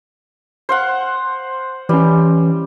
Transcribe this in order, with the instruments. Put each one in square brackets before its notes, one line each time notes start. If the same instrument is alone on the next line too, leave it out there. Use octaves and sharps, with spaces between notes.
[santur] C5 F5 F#5
[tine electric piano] E3 C#4 [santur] G3